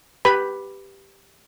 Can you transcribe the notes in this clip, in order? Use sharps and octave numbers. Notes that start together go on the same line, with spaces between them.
G4 B4 B5